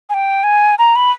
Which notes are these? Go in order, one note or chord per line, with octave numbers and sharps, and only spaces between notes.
G#5
G5
G#5
A#5
B5